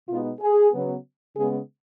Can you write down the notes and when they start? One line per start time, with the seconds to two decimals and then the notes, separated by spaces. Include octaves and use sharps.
0.09 B2 G#3 B3 D#4 F4
0.41 G#4
0.72 C#3 F#3 B3
1.36 C#3 G#3 B3 G#4